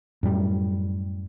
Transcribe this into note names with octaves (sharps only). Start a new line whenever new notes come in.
F#2 A2 G3